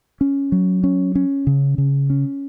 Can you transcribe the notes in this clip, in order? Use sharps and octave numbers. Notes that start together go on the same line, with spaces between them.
C#4
F#3
C#4
C#4
C#3
C#3
C#4